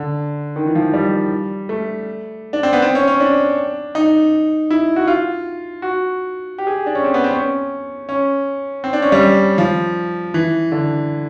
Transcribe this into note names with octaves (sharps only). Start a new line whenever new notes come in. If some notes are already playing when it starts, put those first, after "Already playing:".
Already playing: D3
D#3
E3
F3
G3
A3
D4
C4
B3
C4
C#4
C#4
D4
D#4
E4
F#4
F4
F#4
G4
G#4
D4
C#4
C4
B3
C4
C#4
C#4
C4
D4
C#4
G3
F3
E3
D3